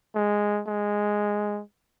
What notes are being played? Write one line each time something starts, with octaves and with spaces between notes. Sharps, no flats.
G#3
G#3